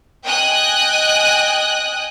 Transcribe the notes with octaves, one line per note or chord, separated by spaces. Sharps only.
D#5 G5 G#5 D#6 F#6